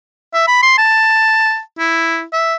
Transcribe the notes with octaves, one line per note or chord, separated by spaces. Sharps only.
E5
B5
C6
A5
E4
E5